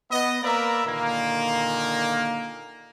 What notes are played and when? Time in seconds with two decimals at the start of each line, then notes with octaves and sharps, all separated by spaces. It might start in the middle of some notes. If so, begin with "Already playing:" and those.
0.11 B3 D#5
0.43 A#3 A#4 B4 D5 E5 A#5
0.85 A#2 D3 D#3 A#3